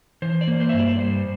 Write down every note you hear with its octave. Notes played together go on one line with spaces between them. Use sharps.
E3 C5
D5
A#3
C5
G2 E5
D5
G3 C5